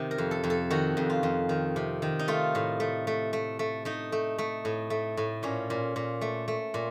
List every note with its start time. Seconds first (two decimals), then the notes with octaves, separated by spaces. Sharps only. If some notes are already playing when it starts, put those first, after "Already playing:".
Already playing: C3 D#3
0.11 A#4
0.18 F2
0.31 A4
0.44 F2
0.50 A4
0.70 D#3 F#4
0.97 F2
1.10 F4
1.23 F2
1.49 D#3
1.76 C3
2.02 D#3
2.19 D#4
2.28 A3 F4
2.55 A2
2.80 A3
3.07 A3
3.33 A3
3.59 A3
3.85 A3 D#4
4.12 A3
4.38 A3
4.65 A2
4.90 A3
5.17 A2
5.43 A#2 C#4
5.70 A#2
5.96 A#2
6.21 A3
6.48 A3
6.74 A#2